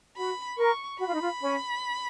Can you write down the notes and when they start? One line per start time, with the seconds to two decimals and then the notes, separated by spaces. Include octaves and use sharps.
0.17 F#4 B5
0.58 A#4 C#6
0.99 F#4 B5
1.07 F4
1.14 D#4
1.22 F4
1.41 C#4